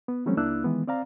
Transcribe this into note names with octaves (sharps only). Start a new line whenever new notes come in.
B3
E3 F#3 G3 A3 C4 C#4
C#2 A#3 D4 E4 E6 F#6
D#3 E3 G#3 B3
C4 D5 F5 A#5